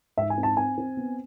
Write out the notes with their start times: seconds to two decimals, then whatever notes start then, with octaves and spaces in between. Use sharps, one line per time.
0.17 G#2 E5
0.30 G#5
0.38 C4
0.43 A5
0.57 C4 G#5
0.78 C4
0.97 B3